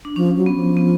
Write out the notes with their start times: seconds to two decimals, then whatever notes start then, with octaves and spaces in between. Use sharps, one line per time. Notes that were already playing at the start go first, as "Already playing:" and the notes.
0.05 D4
0.16 F3 C#4
0.36 F#3
0.46 B3
0.56 F3
0.77 B3